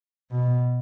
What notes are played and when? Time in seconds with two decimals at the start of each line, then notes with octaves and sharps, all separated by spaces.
0.31 B2